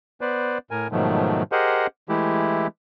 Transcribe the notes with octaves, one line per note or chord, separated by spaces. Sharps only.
B3 B4 C5 D5
A2 A#4 G#5
G#2 B2 D#3 F3 F#3 A3
G4 G#4 A#4 C5 D#5 F#5
E3 G#3 A3 E4 G4